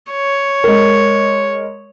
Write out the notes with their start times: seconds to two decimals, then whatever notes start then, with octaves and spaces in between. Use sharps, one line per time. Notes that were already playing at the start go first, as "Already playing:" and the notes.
0.11 C#5
0.64 G#3 A#4